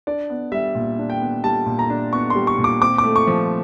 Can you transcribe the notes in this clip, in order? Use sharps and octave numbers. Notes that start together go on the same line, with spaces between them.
D4 D5
B3
G3 E5
A#2
D4
G5
B3
G3 A5
A#2
A#5
D4
B3 C#6
C6
G3
C#6
A#2
D6
C4 D6
D6
A3
C#6
F3